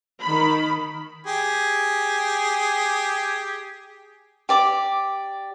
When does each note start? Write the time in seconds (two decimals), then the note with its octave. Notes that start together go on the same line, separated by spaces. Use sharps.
0.21 D#3 B5
1.27 G4 G#4
4.49 G4 D5 D6